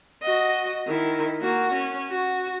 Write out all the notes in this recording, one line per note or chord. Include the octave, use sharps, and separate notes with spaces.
F#4 D#5
D#3 E4
A#3 F#4
C#4
F#4